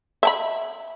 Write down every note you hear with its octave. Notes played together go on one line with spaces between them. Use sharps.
E5 A5 B5